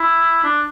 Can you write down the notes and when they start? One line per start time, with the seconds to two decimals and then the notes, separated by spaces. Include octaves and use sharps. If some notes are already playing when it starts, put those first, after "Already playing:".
Already playing: E4
0.44 D4